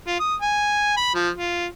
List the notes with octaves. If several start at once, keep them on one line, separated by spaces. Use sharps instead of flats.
F4
D#6
G#5
B5
F3
F4